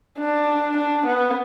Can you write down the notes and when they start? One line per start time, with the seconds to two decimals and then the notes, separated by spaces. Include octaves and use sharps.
0.18 D4
0.77 D4
1.07 B3